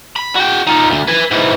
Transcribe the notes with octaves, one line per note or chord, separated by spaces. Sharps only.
B5
F#4 G5
D#4 F4
D2
B4 G#5
G#2 E3